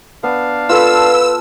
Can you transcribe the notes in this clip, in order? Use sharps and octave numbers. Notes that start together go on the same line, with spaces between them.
B3 D4 F5
F4 A4 B4 A5 E6